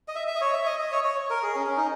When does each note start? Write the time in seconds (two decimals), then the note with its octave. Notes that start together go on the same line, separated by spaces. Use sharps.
0.08 D#5
0.15 E5
0.27 E5
0.35 D#5
0.41 C#5
0.54 E5
0.66 D#5
0.79 D#5
0.92 C#5
1.04 C#5
1.30 A#4
1.43 G#4
1.56 C#4
1.67 C#4
1.77 D#4